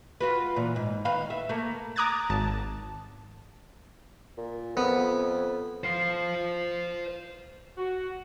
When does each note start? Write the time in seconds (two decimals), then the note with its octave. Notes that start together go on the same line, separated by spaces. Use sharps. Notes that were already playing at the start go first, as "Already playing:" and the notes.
0.21 F4 F#4 B4
0.56 A#2 E3
0.76 G#2
1.05 D#3 B3 F5
1.30 E5
1.49 A3 A#3
1.96 A#5 D6 D#6 F#6 G#6 A6
2.30 G#1 A5
4.37 A#2
4.77 F2 B3
5.84 C5 F5
7.78 F#4